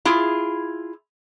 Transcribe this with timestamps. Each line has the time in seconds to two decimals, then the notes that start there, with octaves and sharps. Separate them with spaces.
0.05 E4 F4 G#4